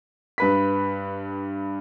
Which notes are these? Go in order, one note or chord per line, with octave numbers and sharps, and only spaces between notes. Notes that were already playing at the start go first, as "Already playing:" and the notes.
G2 B4 B6